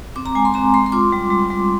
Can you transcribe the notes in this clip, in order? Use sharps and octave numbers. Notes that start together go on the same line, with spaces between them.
C4 D6
A#5
G#3 G#5
C6
C4 A#5
G#3 C6
C6
F4 D6
G3
G3
G3